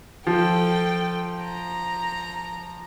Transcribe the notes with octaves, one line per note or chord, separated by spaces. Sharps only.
F3 A4 G5
A#5